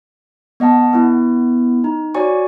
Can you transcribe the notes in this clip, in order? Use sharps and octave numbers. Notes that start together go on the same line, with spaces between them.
B3 D#5 F#5 A5
B3 E4
D#4
F#4 C#5 D5 G#5 C#6